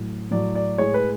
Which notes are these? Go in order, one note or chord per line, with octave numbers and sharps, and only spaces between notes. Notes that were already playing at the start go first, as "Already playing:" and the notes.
Already playing: A2 F#3
A2 F#3 D5
D5
A2 G#3 C#5
B4